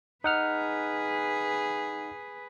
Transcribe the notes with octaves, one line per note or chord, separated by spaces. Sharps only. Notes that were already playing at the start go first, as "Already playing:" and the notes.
D#4 G#4 B4 F#5 F6